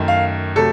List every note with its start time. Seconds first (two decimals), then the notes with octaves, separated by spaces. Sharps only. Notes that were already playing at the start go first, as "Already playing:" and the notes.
Already playing: F#2 D#3 A3
0.08 F5
0.56 C3 F#3 A3 A4